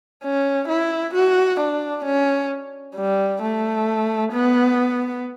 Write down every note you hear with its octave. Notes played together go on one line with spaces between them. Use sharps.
C#4
E4
F#4
D4
C#4
G3
A3
B3